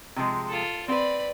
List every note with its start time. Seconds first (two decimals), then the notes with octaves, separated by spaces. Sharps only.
0.16 C3 F3 G#3
0.49 F4 A4
0.88 C4 B4 D5 B5